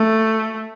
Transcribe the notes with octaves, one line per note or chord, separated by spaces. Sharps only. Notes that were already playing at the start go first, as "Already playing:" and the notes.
Already playing: A3